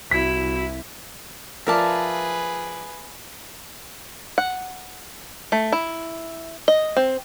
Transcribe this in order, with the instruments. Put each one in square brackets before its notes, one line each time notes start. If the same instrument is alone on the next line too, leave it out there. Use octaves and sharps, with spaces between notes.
[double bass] C2 [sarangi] E4 [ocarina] F#4 [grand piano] B6
[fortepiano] F3 A#4 D5 [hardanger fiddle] G#4 B4 [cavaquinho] E5 F5 A5
[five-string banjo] F#5
A3
E4
D#5
C4